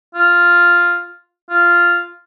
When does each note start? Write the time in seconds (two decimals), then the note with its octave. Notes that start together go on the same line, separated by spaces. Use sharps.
0.15 F4
1.49 F4